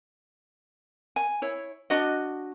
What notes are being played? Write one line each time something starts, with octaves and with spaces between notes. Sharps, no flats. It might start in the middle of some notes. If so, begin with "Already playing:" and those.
G#5
E4 C#5
D4 F#4 D#5